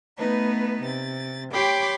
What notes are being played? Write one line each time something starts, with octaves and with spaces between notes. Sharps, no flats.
A3 B3 D#4 B4
C3 A6
G4 C#5 G5 B5 C6 D6